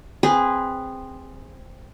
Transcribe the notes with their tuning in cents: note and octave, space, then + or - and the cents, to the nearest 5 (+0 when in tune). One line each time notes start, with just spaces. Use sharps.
C4 +0 G#4 -15 B4 +0